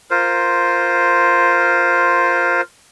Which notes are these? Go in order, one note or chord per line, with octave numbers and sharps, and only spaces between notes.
F4 A#4 C5